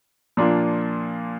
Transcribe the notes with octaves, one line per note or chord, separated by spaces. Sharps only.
A#2 F3 A#3 D4 F4